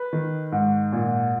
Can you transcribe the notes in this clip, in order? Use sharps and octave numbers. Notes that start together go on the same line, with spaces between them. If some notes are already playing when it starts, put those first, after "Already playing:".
Already playing: B4
D#3
G#2
A#2